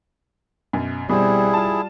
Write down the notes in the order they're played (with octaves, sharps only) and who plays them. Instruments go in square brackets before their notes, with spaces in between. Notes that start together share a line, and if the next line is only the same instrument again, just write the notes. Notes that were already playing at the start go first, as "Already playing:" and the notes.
[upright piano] F#2 B2
[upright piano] B2 C4 [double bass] G3 [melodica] E4 G#4
[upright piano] F4 A5